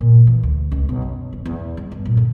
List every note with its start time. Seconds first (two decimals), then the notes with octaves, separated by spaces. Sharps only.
0.01 A#2
0.27 E3
0.43 D2
0.72 C#2
0.89 B1
1.02 F#2
1.33 E1
1.45 E2
1.77 G#3
1.92 G2
2.05 A#2
2.17 D3